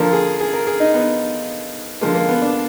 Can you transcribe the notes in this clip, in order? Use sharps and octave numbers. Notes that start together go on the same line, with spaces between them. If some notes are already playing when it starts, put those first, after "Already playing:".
Already playing: D3 F3 A#3 A#4
G#4
G#4
A#4
G#4
D#4
B3
D3 F3 G#3 A#3
A#3
B3
D4